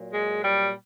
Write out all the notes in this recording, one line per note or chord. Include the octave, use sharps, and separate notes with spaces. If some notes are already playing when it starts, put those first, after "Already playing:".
Already playing: A#2 F#3
G#3
G3